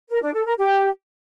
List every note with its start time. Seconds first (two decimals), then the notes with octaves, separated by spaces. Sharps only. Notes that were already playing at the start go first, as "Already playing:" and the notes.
0.09 A#4
0.21 D4
0.33 A4
0.45 A#4
0.57 G4